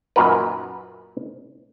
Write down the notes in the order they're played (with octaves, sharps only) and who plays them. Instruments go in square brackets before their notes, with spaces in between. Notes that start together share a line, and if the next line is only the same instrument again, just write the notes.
[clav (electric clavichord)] F#2 A#2 D#4 F#4 A#4 B4